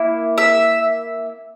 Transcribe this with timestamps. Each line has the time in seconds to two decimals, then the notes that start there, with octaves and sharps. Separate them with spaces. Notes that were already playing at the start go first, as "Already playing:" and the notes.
Already playing: A#3 E4
0.38 E5